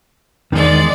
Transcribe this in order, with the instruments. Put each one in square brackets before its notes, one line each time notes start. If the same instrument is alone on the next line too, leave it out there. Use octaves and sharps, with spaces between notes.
[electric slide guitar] E2 D#3 [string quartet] G#3 D5